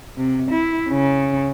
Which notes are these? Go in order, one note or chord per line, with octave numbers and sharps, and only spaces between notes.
C3
E4
C#3